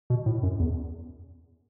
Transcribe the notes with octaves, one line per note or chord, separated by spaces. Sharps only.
B2
A2
F#2
E2